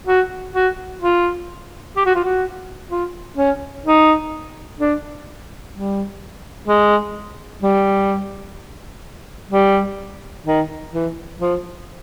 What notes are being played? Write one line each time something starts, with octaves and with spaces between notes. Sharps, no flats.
F#4
F#4
F4
G4
F#4
F4
F#4
F4
C#4
D#4
D4
G3
G#3
G3
G3
D#3
E3
F3